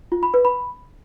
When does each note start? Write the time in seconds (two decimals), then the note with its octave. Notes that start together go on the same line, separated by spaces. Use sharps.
0.12 F4
0.23 B5
0.34 B4
0.45 B5